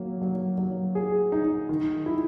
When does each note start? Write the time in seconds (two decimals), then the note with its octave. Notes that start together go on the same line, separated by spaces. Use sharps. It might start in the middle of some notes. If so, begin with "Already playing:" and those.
Already playing: F#3 A#3
0.21 F#3
0.58 F#3
0.95 G#4
1.32 D#4
1.69 D#3
2.06 E4